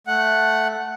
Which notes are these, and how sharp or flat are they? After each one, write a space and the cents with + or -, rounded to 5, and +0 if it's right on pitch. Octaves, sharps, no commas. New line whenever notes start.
A3 +0 F#5 +0